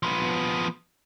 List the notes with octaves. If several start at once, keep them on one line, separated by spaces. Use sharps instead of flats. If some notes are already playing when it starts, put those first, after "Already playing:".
F3 B3